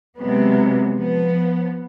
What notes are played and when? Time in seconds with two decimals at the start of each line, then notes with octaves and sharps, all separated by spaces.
0.18 C3 F#3 G#3 B3
0.96 F3 B3